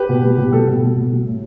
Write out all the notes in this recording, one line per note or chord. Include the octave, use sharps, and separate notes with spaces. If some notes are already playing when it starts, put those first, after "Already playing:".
Already playing: G4 B4
B2
G3
B2 G4
G3 A4
B2
G3
B2
G3
A2